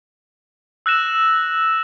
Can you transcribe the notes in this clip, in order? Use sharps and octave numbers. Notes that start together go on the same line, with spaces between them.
E6 F#6 A#6 E7